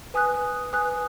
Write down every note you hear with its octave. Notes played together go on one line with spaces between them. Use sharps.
B4 G#5 D#6 F#6
B4 G#5 D#6 F#6